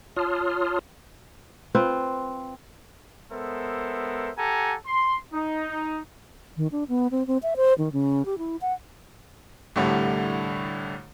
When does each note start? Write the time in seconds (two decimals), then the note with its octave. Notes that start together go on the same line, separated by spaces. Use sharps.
0.16 F4 C#5 A5 C6 D#6 F6
1.75 C4 F4 B4
3.31 G#3 B3 A4 A#4 C5 E5
4.37 G4 A4 F#5 G#5 A#5
4.86 C6
5.33 D#4
6.57 D#3
6.72 D4
6.89 B3
7.11 C4
7.27 C4
7.43 E5
7.56 C5
7.78 D#3
7.93 C#3
8.25 G4
8.38 E4
8.61 F#5
9.76 C2 A2 D3 G3 A3